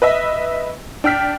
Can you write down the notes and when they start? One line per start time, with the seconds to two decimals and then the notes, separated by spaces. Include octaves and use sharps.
0.02 B4 D#5 E5
1.04 D4 G5 F6 B6